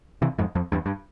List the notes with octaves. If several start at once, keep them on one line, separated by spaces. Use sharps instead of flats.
C3 E3
F2 G#2
F2
E2 G2
G2